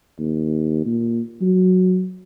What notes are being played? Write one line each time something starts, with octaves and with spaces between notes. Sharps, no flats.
D#2
A#2
F#3